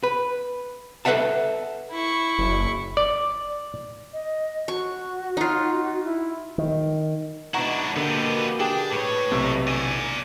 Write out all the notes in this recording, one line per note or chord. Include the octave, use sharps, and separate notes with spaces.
B4
A4 B4 D5 E5 F#5 A5
E4 C#6
F#1
D5
D#5
F#4 C#6
D#4 F4
E4
D#3
G#2 B2 D4 E4 F#5 A#5 C#6
B2 D3 A#3 B3 G4
D4 G4 G#4 G5
A2 B4 C#5
B1 C3 A3
E2 D3 D5 G#5